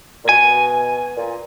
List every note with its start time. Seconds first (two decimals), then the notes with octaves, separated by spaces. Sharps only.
0.24 A#2
0.29 B2 G#5
1.17 A#2